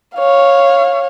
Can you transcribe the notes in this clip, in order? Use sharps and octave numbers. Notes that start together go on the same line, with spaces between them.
C#5 F5